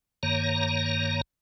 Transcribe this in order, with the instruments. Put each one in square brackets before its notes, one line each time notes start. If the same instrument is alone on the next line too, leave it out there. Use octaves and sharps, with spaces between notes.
[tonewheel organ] G2 D#3 A#3 C#5 A#5